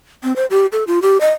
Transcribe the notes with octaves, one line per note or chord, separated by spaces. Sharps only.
C4
C5
G4
A4
F4
G4
D#5